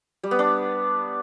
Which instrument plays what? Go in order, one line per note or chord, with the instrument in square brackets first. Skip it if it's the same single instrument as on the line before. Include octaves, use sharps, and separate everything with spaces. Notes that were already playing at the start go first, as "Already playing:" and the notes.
[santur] G3
B3
D4